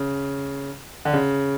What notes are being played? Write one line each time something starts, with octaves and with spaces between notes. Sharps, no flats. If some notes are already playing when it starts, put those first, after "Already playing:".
Already playing: C#3
D3
C#3